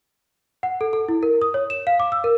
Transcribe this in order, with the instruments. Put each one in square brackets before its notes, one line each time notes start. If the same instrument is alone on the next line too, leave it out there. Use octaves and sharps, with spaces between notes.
[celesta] F#5
A4
A4
E4
A#4
D#6
C#5
E7
F5
D6
E6
A#4